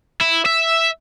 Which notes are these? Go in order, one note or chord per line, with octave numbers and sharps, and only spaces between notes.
E4
E5